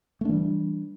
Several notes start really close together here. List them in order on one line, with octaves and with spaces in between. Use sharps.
A3 D4 E3 G3